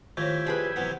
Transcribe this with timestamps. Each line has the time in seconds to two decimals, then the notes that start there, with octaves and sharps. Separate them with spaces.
0.17 D#3 F3 A3 E4 G4 C#5 G#5
0.46 G3 G#4 B4
0.76 C3 E3 F#3 B3